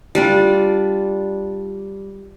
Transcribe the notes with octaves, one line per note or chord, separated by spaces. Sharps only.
G3 D4 F4